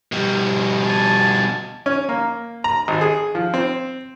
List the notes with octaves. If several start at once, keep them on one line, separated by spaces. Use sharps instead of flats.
B2 G3
G#5 A5
C#4
A#3
A#5
G#1
G#4
F3
C4